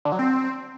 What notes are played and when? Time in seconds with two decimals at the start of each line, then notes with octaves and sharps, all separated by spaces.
0.05 D3
0.12 F#3
0.19 C4